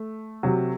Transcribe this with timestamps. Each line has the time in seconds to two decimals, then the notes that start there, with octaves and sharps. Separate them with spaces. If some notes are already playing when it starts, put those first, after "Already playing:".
Already playing: A3
0.43 C3 F#3